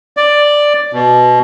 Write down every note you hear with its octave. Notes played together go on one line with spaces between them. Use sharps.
D5
B2